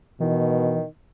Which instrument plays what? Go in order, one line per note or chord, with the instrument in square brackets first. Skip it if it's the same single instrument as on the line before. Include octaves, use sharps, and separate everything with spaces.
[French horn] B2 [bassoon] D#3 [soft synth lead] E3